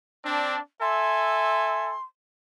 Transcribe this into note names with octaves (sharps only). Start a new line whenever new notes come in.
C4 D4
A4 E5 G#5 C6